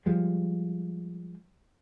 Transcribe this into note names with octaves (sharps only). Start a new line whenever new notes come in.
F3 G3 G#3